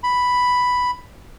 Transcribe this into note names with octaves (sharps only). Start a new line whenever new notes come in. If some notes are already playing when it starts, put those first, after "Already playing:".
B5